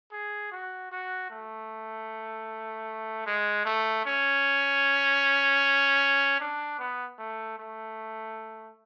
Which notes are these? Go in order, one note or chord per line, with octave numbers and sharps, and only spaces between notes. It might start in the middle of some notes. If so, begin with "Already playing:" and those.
G#4
F#4
F#4
A3
G#3
A3
C#4
D4
B3
A3
A3